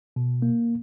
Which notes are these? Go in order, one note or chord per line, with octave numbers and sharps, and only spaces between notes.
B2
A#3